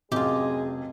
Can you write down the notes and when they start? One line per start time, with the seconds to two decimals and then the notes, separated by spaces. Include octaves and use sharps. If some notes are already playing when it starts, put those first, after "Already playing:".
0.12 F1 F#2 F4 G4 G#4 D#5